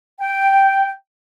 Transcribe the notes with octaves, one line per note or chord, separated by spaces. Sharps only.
G5